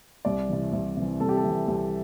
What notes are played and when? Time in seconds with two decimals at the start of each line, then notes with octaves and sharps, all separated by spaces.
0.25 C2 D5
0.49 C3 E3
0.73 C2
0.97 C3 E3
1.20 C2 A4
1.29 G4
1.37 A4
1.44 C3 E3
1.68 C2